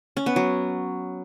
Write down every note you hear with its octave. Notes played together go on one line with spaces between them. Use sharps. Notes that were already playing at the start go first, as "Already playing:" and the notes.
C#4
B3
F#3